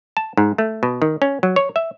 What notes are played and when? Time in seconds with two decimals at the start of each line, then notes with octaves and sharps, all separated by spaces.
0.17 A5
0.37 G#2
0.58 A3
0.83 B2
1.02 D#3
1.22 C#4
1.43 F#3
1.56 C#5
1.76 E5